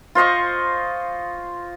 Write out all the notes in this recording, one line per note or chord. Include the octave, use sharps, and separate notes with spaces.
F4 C5 D#5 C#6